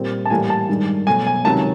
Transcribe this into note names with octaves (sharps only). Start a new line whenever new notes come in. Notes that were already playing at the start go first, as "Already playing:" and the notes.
Already playing: A#2 G3 C4
A5
A2 E3 G3 A#3 G#5
A5
G2 D#3 G#3
B2 F#3 A3 G#5
G#5
C#2 C3 D#3 F#3 A5